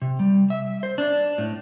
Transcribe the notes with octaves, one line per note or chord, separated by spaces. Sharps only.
C3
G3
E5
C5
D4
A2